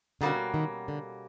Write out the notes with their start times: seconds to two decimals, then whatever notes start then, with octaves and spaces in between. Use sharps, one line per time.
0.21 B2 D3 G3 A#3 C#4 F#4
0.54 D#3
0.88 D3